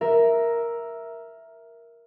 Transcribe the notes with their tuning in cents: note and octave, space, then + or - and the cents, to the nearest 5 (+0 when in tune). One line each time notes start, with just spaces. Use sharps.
A#4 +5 E5 +0